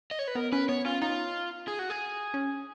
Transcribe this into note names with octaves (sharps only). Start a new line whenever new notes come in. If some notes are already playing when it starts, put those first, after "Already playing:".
D#5
C#5
B4
B3 A#4
C#4 B4
B3 C#5
C#4 F4
D#4 F4
G#4
F#4
G#4
C#4